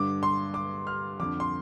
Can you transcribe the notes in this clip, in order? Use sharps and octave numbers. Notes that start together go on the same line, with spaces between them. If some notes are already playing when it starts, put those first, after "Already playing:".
Already playing: G2 D3 D6
C6
D6
F6
F2 D3 D6
C6